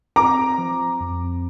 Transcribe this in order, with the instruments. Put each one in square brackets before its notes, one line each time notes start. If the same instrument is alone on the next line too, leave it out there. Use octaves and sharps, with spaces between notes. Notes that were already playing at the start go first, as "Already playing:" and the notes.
[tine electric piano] C4 [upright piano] A#5 D6
[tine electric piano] F3
F2